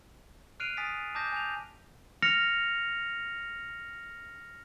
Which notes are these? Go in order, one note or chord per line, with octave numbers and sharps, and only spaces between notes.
F6 F#6 C7 D7 D#7 F7
G#5 D#6 A6 B6 D7
A5 D6 D#6 G6 A#6
G#5 G6 F7
F6 A#6 C#7 F7